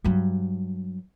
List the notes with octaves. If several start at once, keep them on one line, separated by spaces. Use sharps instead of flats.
G2 F#3